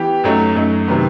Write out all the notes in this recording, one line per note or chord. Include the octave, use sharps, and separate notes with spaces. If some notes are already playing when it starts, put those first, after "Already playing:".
Already playing: E3 B3 G4
F#2 F#3 A3 D#4
F#2 F#3 A3 D#4
C3 D#3 F#3 B3